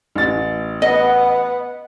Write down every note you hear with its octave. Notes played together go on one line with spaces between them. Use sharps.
A1 A6
B3 D#5 F#5